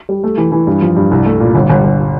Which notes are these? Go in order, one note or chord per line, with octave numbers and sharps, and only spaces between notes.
G3
A3
E3
E3
G2
F3
G2
C2
A3
A#2
G1
G1
G1